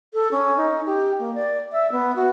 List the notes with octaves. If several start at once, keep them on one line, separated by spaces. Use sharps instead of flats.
A4
C#4
D#4
G4
A#3
D5
E5
B3
F#4